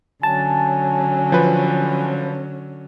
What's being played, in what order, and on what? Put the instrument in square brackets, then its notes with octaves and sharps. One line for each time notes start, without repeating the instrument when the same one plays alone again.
[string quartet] D3 F#3 C#4 [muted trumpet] G#5 [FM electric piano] A5
[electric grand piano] F3 B4